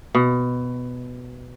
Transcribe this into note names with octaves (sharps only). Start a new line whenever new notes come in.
B2